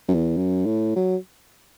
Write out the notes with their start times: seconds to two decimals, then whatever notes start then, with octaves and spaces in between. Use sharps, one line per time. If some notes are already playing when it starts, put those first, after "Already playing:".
0.08 F#2
0.14 E2
0.37 F#2
0.66 A2
0.96 F#3